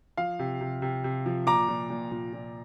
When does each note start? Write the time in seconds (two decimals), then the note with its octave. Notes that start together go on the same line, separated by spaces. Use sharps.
0.17 F3 F5
0.39 C3
0.61 C3
0.82 C3
1.04 C3
1.26 F3
1.47 A#2 A#5 D6
1.68 A#2
1.90 A#2
2.12 A#2
2.33 A#2